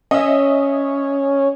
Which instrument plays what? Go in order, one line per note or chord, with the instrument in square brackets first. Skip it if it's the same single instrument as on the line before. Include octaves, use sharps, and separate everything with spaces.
[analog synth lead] C#4 [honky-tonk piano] D#5 E5